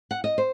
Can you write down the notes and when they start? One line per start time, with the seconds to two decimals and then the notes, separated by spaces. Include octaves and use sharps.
0.11 F#5
0.24 D#5
0.38 C5